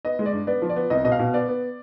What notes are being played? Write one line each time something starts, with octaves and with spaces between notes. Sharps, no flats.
B3 D#5
G#3
D5
G2
B3 D5
F3
D5
B3
C2 D#5
B2 D#5
F5
B2
B3 D5
B3